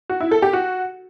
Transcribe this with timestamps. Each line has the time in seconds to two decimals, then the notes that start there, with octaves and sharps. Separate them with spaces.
0.10 F#4
0.20 E4
0.31 A4
0.42 G4
0.53 F#4